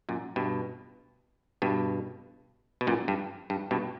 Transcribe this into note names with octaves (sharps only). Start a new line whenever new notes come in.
F#2 A#2
G2 B2
G2 B2
B2
F#2 A#2
G2
G2
G2 B2